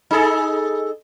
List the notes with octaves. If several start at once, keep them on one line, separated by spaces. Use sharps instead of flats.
D#4 G#4 A4